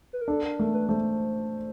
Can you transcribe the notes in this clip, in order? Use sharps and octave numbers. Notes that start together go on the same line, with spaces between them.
B4
A#4
D4 A4
A#4
A3 A#4
B4
A3 C5